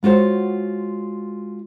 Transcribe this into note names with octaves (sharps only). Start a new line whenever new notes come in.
G#3 F4 F#4 C5 C#5